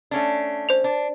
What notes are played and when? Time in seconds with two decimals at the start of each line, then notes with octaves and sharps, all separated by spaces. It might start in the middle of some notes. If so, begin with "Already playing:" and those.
0.11 A3 C#4 D4
0.69 C5 F7
0.84 D4